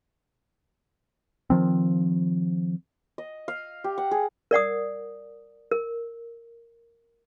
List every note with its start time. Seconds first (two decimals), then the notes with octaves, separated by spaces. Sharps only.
1.50 D#3 F3 C4
3.18 D#5
3.48 F5
3.84 G4
3.98 F#5
4.11 G#4
4.51 A#4 D5 F#5 D#6
5.71 A#4